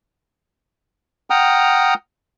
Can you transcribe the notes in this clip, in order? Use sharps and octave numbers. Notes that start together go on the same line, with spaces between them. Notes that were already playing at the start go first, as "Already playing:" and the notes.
F#5 G5 A#5 D#6 F6